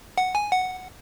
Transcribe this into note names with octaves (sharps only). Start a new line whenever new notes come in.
F#5
G#5
F#5